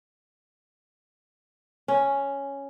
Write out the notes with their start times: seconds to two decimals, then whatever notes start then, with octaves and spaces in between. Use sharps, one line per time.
1.88 C#4